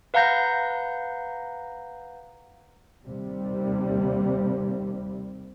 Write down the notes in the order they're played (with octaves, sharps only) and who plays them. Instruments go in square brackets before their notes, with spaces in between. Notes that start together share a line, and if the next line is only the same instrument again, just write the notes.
[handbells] B4 F5 F#5 A#5 G6 A#6
[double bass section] D#2 C3 G3